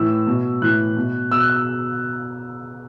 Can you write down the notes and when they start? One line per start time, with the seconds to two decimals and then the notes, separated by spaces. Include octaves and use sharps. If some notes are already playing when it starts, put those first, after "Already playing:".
Already playing: A2 E3 E6
0.27 B2
0.62 A2 E3 F#6
0.96 B2
1.31 B2 E6
1.40 F#6
1.50 E6